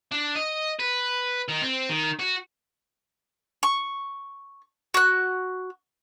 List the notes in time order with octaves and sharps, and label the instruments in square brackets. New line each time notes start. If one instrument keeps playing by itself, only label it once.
[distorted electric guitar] D4
D#5
B4
D#3
C4
D#3
F#4
[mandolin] C#6
F#4 F#6